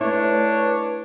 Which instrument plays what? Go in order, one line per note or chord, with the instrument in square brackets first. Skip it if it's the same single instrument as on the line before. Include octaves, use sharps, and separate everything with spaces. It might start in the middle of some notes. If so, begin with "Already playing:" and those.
[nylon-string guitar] A3 E4 [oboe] D4 [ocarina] B4 [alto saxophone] C#5